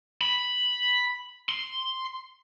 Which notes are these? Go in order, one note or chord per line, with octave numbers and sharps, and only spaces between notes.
B5
C6